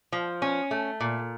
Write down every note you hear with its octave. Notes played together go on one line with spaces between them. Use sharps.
F3
C#4
A3
A#2